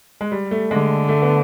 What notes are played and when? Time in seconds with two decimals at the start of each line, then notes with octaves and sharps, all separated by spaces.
0.21 G#3
0.32 G3
0.51 A3
0.71 D3 G#3
1.09 A3
1.22 B3